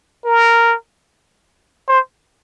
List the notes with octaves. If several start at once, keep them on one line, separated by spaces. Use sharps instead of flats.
A#4
C5